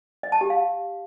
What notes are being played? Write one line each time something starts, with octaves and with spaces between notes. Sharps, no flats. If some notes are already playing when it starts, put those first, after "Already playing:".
D#5
A5
G4
F5